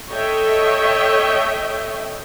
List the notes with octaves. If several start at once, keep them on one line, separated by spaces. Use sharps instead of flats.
A4 C#5 D#5 E5 G5